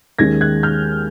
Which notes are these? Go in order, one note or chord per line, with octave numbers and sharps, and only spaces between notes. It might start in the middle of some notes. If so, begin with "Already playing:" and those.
D#2 D#3 G#3 C#4 G#6 A#6
F#6 G#6
F6 G6